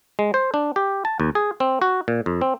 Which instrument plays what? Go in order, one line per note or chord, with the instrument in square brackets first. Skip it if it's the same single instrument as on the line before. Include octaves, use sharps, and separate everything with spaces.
[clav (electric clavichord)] G#3
C5
D4
G4
A5
D#2
G#4
C4
F#4
A#2
F2
C4